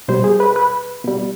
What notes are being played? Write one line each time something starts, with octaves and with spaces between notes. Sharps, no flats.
B2 G3 C5
G#4
B4
B4
B2 G3